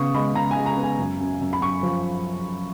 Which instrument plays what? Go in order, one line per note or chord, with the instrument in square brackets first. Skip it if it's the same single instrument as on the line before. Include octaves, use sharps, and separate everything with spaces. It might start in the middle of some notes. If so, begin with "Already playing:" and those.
Already playing: [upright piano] C#3 B3 C#6 D#6
G#3 B5
C#3 A#5
G#5
G#3
A#5
B3
G#5
F#2
F#2
F#2
B5
F#2 C#6
F3